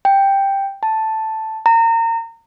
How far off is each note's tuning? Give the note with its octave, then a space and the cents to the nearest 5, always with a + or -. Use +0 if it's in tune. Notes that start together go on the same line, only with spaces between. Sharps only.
G5 +5
A5 +0
A#5 -30